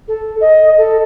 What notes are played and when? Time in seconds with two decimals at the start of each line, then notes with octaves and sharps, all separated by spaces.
0.08 A4
0.41 D#5
0.78 A4